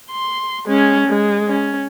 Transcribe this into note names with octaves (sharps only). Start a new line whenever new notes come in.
C6
G#3 C#4
G#3
C#4